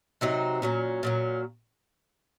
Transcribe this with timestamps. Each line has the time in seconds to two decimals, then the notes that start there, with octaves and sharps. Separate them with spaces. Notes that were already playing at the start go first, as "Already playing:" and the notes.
0.21 C3 F#3 C4 D#4
0.62 A#2 F#3 C#4
1.03 A#2 F#3 C#4